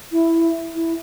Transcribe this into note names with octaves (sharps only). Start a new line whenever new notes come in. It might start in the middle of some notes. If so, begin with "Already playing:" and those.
E4
E4